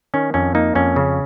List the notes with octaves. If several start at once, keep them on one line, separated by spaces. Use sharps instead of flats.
D#3 C#4
F2 C#4
A#3 D#4
F2 C#4
C#3